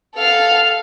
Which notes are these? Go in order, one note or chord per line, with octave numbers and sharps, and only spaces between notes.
A4 F5